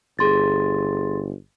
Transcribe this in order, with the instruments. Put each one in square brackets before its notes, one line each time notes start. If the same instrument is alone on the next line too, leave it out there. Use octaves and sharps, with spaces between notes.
[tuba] G1 [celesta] G#4 C6 A6